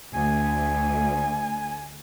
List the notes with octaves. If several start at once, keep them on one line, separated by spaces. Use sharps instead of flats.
D2 G#5